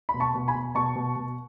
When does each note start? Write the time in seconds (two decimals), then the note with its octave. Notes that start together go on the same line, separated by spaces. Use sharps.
0.09 B5
0.14 B2
0.20 A5 C#6
0.35 B2
0.48 G#5 B5
0.54 B2
0.75 B2 A5 C#6
0.96 B2
1.16 B2